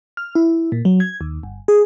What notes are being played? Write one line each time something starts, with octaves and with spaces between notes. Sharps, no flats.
F6
E4
A#2
F#3
G#6
D#2
G1
G#4